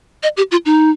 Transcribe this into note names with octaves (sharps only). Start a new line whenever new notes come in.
D#5
G4
F4
D#4